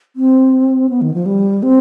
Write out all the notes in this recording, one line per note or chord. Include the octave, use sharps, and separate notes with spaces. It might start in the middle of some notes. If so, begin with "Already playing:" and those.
C4
B3
D#3
F3
G3
C4